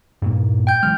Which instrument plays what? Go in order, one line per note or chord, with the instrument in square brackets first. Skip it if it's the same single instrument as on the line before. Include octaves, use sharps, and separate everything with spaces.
[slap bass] G2 A#2 A#3
[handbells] G5 G6
[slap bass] E3 F#3 G#3 [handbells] F6